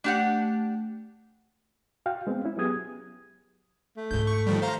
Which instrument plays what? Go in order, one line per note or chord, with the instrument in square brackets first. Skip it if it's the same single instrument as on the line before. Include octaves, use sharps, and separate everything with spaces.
[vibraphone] A3 [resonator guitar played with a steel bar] D4 G4 F#5
[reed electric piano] F#4 F5 G5
G#3 B3 C4
C#4 E4
F#3 B3 G4 G#4 D#6 G#6
[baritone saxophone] A3
[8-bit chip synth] C#2 G6 [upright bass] G#2 E4
[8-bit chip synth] C#6
D#3 F3 G3
C5 F5 A#5